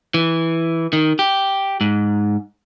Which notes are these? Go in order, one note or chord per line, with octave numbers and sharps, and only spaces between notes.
E3
D#3
G4
G#2